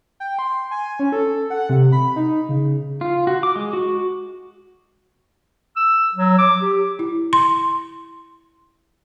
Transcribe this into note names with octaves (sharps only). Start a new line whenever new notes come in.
G5
C6
G#5
C#4
A4
F#5
C3
B5
D#4
C#3
F4
F#4
D6
G#3
F#4
E6
F#3
D6
G4
E4
C6